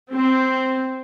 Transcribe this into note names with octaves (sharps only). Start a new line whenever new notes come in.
C4